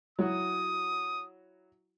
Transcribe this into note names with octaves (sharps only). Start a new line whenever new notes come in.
F#3 E4 F#4 D#6